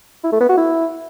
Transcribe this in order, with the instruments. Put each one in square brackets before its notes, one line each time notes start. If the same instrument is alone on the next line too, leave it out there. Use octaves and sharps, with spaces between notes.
[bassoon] E4
A3
B3
F#4
E4